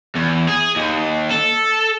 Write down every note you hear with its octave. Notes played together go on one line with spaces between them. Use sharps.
E2
G#4
D#2
A4